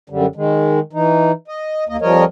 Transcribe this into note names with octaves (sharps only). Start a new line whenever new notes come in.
F#2 D3 G3
D#3 G#3
E3 D#4
D#5
D#2 A#3 D#5
F2 F3 G3 A#4 C#5 D#5